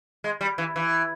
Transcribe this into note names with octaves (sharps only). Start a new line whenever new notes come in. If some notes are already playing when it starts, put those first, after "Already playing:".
G#3
G3
E3
E3